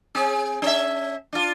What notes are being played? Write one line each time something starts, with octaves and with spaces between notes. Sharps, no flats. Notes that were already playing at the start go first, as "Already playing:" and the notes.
C4 G#4
C#4 E5
D4 F4